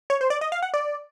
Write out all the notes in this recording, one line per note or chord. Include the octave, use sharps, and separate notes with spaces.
C#5
C5
D5
D#5
F5
F#5
D5